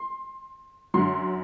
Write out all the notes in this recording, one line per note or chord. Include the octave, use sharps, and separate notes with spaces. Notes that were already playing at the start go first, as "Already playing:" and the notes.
Already playing: C6
F#2 D3 F#3 C6